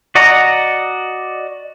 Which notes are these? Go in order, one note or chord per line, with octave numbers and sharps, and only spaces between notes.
F#4 D5 D#5 F#5 A#5